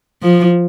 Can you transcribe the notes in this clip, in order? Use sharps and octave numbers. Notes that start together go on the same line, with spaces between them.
F3